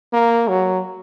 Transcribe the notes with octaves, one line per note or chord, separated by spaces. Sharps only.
A#3
F#3